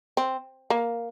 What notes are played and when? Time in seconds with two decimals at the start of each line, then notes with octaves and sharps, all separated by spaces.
0.17 C4
0.70 A#3